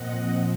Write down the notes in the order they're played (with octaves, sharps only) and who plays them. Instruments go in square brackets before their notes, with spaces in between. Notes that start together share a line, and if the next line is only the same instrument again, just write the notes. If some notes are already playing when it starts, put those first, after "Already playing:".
Already playing: [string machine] A#2 F3 C4 D#5 F#5